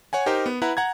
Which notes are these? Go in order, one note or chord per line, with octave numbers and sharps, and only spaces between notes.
C#5 F#5 G#5
D#4 G4 A#4 C5
B3
E4 B4 F#5 A#5
F#5 A#5 G#6